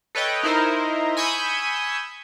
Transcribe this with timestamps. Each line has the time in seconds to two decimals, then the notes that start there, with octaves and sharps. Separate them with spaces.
0.15 A4 B4 C#5 D#5 G5
0.43 D#4 E4 A#4 C5 D#5
1.17 G#5 B5 C#6 D#6 E6 G6